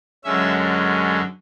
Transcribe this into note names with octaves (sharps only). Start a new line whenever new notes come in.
F#2 D3 G#3 C#4 E5